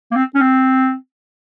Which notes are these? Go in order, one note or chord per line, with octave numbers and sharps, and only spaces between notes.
A#3
C4
C#4
C4